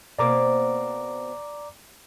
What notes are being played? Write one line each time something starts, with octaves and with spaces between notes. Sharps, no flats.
B2 A#3 C4 D5 A#5 D6